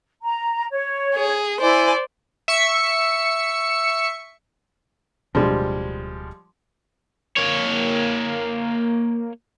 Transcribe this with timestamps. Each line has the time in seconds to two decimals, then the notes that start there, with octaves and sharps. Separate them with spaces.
0.23 A#5
0.72 C#5
1.15 G#4
1.61 E4 C5 D5 G#5
2.48 E5 C#6 C#7
5.35 D1 B2 F3 G3 G#3 D4
7.37 A#3 C#5